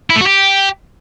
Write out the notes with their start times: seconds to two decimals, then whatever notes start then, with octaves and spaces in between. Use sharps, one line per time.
0.10 E4
0.16 A3
0.21 F#4
0.26 G4